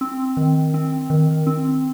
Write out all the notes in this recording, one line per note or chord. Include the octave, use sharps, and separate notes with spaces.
C4
D#3
C4
D#3
C4